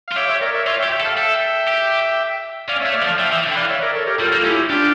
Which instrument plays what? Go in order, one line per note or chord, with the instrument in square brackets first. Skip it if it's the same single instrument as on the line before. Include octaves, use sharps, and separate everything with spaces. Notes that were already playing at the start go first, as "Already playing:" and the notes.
[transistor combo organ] F5
[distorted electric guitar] F4
[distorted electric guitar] G4 [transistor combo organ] C#5 E5
[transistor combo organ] C#5 E5
A#4 D5
C#5 E5
[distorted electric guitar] F4 [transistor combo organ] C#5 E5
[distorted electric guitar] G4 [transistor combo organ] E5 G5
[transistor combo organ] E5 G5
[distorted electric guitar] A4
[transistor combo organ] F5 A5
[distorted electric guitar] A4 [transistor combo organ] E5 G5
[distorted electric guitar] G4
[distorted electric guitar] C#4 [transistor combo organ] D5 F5
[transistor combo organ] C#5 E5
[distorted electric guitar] A3
[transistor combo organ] D5 F5
[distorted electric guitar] F3
[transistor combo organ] F5 A5
[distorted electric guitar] F3 [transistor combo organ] E5 G5
[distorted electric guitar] E3 [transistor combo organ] E5 G5
[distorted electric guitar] D3
[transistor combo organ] G5
[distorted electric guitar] E3 [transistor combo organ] D5 F5
[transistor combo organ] C#5 E5
A#4 D5
A4 C#5
G4 A#4
[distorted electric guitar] G3 [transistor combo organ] F4 A4
[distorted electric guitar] A#3
[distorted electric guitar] C#4 [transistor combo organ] E4 G4
[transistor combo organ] D4 F4 [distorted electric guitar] G4